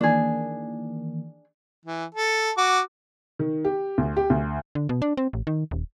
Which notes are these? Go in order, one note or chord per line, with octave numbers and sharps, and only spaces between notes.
D#3 E3 A#3 D4 G#4
E3
A4
F#4 D6
D#3
G4
D2
G4
D2
D3
B2
D4
C4
A1
D#3
D#1